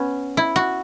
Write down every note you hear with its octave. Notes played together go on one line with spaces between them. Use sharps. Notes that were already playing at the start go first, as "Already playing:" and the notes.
Already playing: B3 C#4
E4
F#4